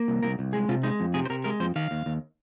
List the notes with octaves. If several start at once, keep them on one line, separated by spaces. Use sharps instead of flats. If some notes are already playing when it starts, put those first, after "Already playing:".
Already playing: A#3
C2
C2 A#4
C2
G#3 G#4
C3 F4
G#3 D#4
F2
C3 G#4
C5
C3 A#4
G#3 A#4
F2 C5
D#3 F5
D#2
D#2